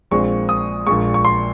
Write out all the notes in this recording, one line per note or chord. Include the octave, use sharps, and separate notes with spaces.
A#1 A#2 G#3 C4 C#6
D#6
A#1 A#2 G#3 C#6
C#6
C6